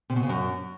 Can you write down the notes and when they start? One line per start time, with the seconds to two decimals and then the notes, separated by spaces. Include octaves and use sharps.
0.10 C3
0.16 B2
0.23 C#3
0.29 F#2